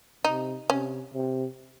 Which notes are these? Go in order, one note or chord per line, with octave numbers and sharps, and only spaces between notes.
C3 D#4
C3 C#4
C3